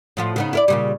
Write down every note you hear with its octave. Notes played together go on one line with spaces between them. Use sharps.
A2 F3 F4
C#3 B3 D#4
E4 A#4 D5
A#2 C#3 G3